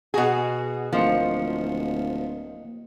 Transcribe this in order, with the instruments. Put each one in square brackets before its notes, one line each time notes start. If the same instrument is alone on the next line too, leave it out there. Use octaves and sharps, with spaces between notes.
[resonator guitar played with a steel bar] B2 G#4 [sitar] F#4
[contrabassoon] D1 [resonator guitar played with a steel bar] F3 [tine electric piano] A#3 D#5 C#7